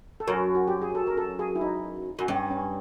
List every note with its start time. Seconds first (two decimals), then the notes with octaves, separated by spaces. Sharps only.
0.20 A4
0.28 F#2 A#4
0.55 F#4
0.68 G4
0.81 G#4
0.95 A4
1.07 A#4
1.17 A4
1.39 G#4
1.56 E4
1.61 D#4
2.19 F#2
2.28 G2 C#4
2.51 C#4